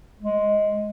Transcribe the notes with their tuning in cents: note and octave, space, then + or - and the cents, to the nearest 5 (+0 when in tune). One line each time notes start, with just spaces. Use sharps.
G#3 +10